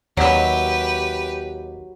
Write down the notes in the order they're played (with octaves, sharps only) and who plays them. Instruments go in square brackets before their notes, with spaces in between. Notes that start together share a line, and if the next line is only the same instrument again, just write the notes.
[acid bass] D#2 [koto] F#3 E5 [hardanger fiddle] G4 B4